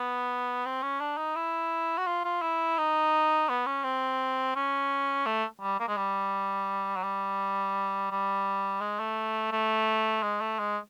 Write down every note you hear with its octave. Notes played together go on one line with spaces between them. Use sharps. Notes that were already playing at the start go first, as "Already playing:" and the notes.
Already playing: B3
C4
C#4
D4
D#4
E4
F#4
F4
F4
E4
D#4
B3
C#4
C4
C#4
A3
G3
A#3
G#3
G3
F#3
G3
G3
G#3
A3
A3
G#3
A3
G#3